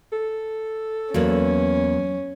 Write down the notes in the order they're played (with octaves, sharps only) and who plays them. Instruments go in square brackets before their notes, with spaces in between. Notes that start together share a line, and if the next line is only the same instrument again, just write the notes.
[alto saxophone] A4
[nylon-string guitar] E2 A#3 B3 [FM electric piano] F#3 [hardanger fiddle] C#4